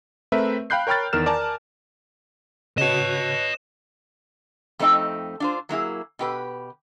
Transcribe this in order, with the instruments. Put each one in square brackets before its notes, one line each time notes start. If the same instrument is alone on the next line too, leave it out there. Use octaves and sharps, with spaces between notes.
[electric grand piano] A3 C4 A#4 B4 E5
F5 G5 B5 F#6 G6 C7
A#4 C#5 G5 B5 F6 A6
E2 D#3 A#4 F6 E7
A#4 D5 G#5 A5
[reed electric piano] C#3 F#4 [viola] B4 C#5 [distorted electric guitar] D#5 A5 [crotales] E7
[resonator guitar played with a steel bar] F2 A3 C4 D#4 D#5 G5
D4 F4 C5
F#3 A#3 E4 G#4
B2 G4 B4